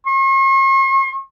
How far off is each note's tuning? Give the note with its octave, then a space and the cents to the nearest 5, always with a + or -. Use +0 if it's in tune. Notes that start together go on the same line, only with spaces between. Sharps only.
C#6 -45